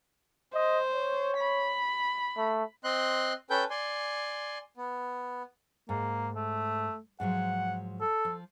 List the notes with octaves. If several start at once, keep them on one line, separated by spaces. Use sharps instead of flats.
C5 D#5
C#5
B5
A3
C4 D#5 C6 F#6
C#4 A4 B4 G5 G6
D5 G#5 C6
B3
G#2 A#3
A3
G#2 F3 F#3 F#5
A4
F3